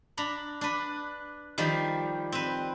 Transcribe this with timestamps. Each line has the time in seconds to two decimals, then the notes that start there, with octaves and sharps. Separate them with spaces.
0.17 D4 A#5 B5
0.61 D4 B4
1.58 D#3 F3 G3
2.32 C4 B4